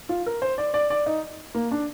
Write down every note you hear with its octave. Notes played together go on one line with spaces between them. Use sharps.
F4
A#4
C5
D5
D5
D5
D#4
A#3
D4